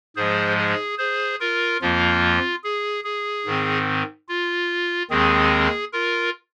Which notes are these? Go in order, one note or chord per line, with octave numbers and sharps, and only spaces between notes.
G#2 F3 G#3 G#4 C5
G#4
G#4 C5
F4 A#4
F2 F3 A#3 F4
G#4
G#4
G#2 D#3 C4
F4
D#2 D#3 G#3 C4 G#4
F4 A#4